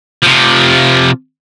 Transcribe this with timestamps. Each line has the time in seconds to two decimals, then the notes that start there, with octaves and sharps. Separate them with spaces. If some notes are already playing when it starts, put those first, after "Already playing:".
0.23 C3 F3